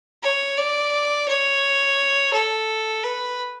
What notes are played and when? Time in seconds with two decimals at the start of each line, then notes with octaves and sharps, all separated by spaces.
0.23 C#5
0.58 D5
1.28 C#5
2.33 A4
3.03 B4